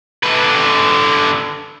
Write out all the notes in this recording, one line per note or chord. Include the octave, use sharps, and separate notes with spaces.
D3 B4